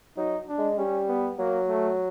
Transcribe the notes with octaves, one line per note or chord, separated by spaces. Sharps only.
F#3 D#4
D4
G#3
G3 C#4
B3
F#3 A#3
A3